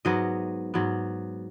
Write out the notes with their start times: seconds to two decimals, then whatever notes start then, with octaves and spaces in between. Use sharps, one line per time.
0.05 G#2 F#3 B3 D#5
0.74 G#2 F#3 B3